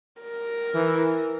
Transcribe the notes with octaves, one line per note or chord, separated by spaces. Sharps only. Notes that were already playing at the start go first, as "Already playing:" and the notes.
A#4
E3